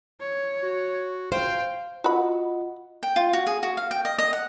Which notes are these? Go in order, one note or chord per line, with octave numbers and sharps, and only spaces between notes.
C#5
F#4
C5 F5 G5
F4 F#4 D#5 F#5 B5
G5
F4
F#4
G#4
F#4
F5
G5
D#5
D#5
F#5